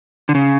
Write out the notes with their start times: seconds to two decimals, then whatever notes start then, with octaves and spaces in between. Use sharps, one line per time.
0.29 D3
0.35 C#3